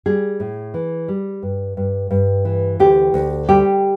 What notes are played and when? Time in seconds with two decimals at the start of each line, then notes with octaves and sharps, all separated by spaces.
0.06 G3 G#4
0.40 A2
0.74 E3
1.08 G3
1.43 G2
1.77 G2
2.11 G2
2.45 E3
2.80 D2 G4
3.14 D2
3.48 G3 G4